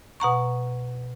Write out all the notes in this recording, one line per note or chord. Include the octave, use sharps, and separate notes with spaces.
B2 F#5 A#5 C#6